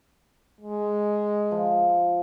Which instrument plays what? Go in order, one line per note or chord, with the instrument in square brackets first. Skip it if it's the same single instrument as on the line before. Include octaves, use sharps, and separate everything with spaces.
[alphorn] G#3
[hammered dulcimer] F3